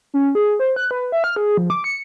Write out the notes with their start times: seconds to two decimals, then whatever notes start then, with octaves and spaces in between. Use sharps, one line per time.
0.14 C#4
0.35 G#4
0.60 C5
0.76 F#6
0.91 B4
1.12 E5
1.24 F6
1.36 G#4
1.57 F3
1.70 D6
1.84 C#7